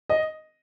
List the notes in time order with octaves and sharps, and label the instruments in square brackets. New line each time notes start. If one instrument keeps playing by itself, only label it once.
[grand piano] D#5